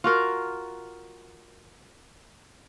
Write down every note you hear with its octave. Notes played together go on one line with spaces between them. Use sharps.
F4 F#4 A#4